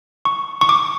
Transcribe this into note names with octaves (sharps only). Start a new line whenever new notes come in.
C#6
C#6
D6